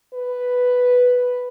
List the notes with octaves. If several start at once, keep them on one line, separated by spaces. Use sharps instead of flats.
B4